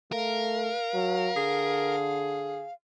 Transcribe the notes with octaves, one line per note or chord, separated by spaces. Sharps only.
A3 A#4 F5
F#3
D3 G#4